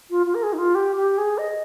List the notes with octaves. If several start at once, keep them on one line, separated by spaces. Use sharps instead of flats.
F4
F4
A#4
G#4
D#4
F4
G4
G4
G#4
D#5